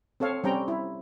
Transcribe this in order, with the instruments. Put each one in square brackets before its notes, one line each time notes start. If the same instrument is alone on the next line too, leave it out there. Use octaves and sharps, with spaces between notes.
[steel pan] C4 A4 C#5 F5
G3 C4 C#4 G5 A#5
E4